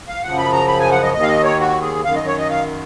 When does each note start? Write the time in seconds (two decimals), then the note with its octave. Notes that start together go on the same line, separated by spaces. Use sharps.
0.08 F5
0.23 F#2 C#3 F3 F#5
0.38 B5
0.53 A#5
0.68 B5
0.80 G#5
0.91 F#5
1.03 D#5
1.14 D#2 D#3 D#5
1.23 F5
1.28 D#5
1.44 C#5
1.59 F#4
1.81 G#4
2.04 F#2 D#3 F5
2.16 D#5
2.27 C#5
2.38 D#5
2.50 F5